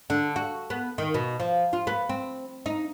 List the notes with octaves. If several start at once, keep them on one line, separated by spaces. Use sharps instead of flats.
D3
F#4
B3
D#3
B2
F3
F4
B3
C4
D#4